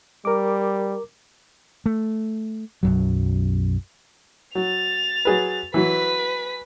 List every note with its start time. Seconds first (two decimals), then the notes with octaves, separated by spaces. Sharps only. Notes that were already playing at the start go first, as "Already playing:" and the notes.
0.25 G3 A#4 D6
1.86 A3
2.83 B1 F#2 F#3
4.55 F#3 A6 F7
5.25 F#3 G#4 B4
5.74 E3 F#3 B4 B6